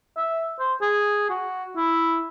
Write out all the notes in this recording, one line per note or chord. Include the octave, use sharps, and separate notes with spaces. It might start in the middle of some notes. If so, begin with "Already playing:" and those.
E5
C5
G#4
F#4
E4